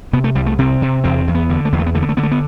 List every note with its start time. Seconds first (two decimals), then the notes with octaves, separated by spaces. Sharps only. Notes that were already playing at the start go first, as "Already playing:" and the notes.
0.13 C3 B3
0.24 A3
0.35 C2 G3
0.46 A3
0.59 C3 C4
0.82 C3
1.04 E2 C4
1.27 E2
1.35 B3
1.49 D3
1.65 A3
1.73 E2 B3
1.79 A3
1.86 B3
1.95 D3 A3
2.02 B3
2.09 A3
2.17 D3 B3
2.23 A3
2.32 B3